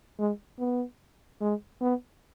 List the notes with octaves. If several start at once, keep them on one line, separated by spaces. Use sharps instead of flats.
G#3
B3
G#3
B3